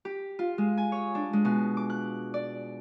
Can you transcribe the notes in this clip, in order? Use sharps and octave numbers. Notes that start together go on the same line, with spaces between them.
G4
F4
G#3
G#5
C#5
D4
G#3
B2
D6
F#6
D5